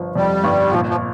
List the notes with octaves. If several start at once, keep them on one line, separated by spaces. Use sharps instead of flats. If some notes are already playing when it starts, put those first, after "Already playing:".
Already playing: G1 F3
F2 G3
G1
A#2 F3
F3